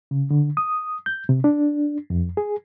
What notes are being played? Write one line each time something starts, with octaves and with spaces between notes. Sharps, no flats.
C#3
D3
D#6
G6
C3
D4
F2
G#4